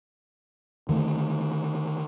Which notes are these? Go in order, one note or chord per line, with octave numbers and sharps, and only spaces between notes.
D3 D#3 A3